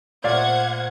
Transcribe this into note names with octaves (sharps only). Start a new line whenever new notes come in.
A#2 A3 C5 D5 F5 F#5 G#6